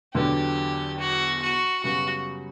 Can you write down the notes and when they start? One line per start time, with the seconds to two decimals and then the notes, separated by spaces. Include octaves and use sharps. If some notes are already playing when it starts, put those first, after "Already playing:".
0.14 E2 D3 F#3 B3 D4 G4
0.99 F#4
1.42 F#4
1.83 F#2 C#3 G3 B3 F#4